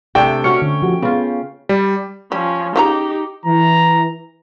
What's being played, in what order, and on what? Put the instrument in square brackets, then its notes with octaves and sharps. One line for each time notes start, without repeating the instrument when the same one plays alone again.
[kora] C3 A3 D4 [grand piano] G5
[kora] C#4 C#5 [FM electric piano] F#4 F6 C#7
[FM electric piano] D3
F3 F#4 G4
[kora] C#3 F4 [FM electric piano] B3
[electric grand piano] G3
[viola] F3 C#4 [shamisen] G3
[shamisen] C#3 F4 A#5 [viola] D#4 G4
[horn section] E3 [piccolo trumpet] A#5